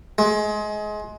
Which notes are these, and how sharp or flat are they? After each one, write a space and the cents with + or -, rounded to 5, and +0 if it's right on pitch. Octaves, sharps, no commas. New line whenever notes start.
G#3 +25